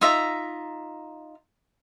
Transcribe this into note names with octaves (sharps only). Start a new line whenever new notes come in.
D#4 F4 E5 A#5